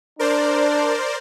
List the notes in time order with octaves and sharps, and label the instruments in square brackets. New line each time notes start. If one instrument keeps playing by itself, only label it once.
[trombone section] D4 [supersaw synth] A#4 C5 D5